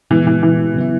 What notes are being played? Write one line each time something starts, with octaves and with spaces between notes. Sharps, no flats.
A#2 E3 G#3 B3
E3
E3
C#3 F#3 B3 E4